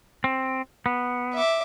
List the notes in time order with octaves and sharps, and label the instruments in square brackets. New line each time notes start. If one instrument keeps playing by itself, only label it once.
[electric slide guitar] C4
B3
[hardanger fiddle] E5 D6